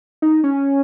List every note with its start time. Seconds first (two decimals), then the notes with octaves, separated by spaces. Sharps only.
0.22 D#4
0.44 C#4